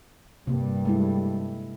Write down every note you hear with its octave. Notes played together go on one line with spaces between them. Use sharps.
G2 C3 G3 A#3
G#3 A3 E4